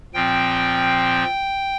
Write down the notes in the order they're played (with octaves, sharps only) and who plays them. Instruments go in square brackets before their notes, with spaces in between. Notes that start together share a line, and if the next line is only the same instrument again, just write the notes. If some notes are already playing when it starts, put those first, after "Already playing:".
[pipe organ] A#2 F3 C4 G5